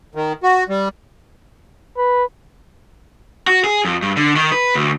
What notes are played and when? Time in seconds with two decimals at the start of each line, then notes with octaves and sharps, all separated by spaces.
0.15 D#3
0.43 F#4
0.69 G3
1.97 B4
3.47 F#4
3.64 G#4
3.85 F2
4.02 G2
4.17 D3
4.36 D#3
4.52 B4
4.75 D2